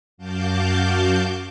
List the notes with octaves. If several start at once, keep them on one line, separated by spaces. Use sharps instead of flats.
F#2 F#4 F5 A5 D6 G6